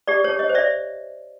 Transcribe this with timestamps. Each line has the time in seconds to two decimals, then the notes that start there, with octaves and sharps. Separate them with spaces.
0.08 G4 D5
0.24 C#5
0.29 G4
0.39 C#5 D#5
0.49 C5
0.55 D5 E5